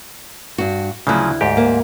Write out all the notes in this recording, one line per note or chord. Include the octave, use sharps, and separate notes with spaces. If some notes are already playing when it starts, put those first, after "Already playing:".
G2 F#4
D2 C#3 F3 F#3 E4
D2 G#2 G4
A#3